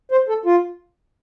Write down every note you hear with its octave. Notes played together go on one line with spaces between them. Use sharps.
C5
A4
F4